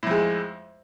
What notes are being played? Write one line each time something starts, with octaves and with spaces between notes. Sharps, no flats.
F2 A2 G#3